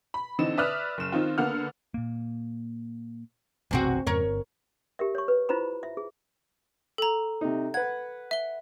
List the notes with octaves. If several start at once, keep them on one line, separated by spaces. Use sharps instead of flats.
B5
D3 E3 C4 D#4 D#5 E7
B4 D5 E5 D#6 F6 F#6
F#1 E7
D#3 C4 D#4 F4
D3 A#3 B3 F#5 F6
A#2 A#3
F#1 B1 E2 C3 C4 F#4
F2 G#2 C#3 A#4 C#5
G1
G4 A#4 E5
C#5 C#6
B4
E4 F4 C5 A#5 B5
E5
G#4
A4 A#5
C3 D#4
B4 F#5 G#6
E5 G7